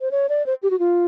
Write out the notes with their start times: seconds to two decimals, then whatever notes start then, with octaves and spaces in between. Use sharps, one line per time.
0.01 C5
0.11 C#5
0.29 D5
0.46 C5
0.63 G4
0.71 F#4
0.79 F4